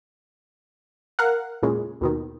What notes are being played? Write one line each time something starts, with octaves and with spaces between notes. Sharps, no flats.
A#4 F5 F#5
E2 A#2 C#3 G#3
D#2 B2 D#3